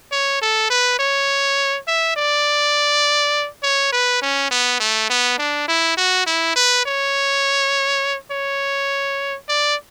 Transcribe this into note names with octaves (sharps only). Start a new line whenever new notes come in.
C#5
A4
B4
C#5
E5
D5
C#5
B4
C#4
B3
A3
B3
D4
E4
F#4
E4
B4
C#5
C#5
D5